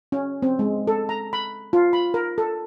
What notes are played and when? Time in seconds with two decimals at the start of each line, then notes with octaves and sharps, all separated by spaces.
0.12 C#4
0.42 C4
0.59 G#3
0.87 A4
1.09 A#5
1.33 B5
1.73 F4
1.93 B5
2.14 A#4
2.38 A4